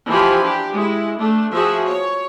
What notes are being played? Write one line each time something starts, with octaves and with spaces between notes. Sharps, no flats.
E3 F3 F4 G4 G#5 B5
D4 G4
G#3 E4
A3 D4
F3 F#4 G#4 E5
C#5